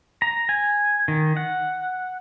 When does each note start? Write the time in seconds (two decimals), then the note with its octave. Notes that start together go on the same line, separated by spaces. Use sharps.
0.22 A#5
0.49 G#5
1.08 D#3
1.37 F#5